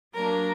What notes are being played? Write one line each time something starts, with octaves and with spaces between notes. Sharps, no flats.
F#3 A#3 D4 A#4